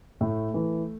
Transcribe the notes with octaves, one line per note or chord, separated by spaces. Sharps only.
A2 A3
E3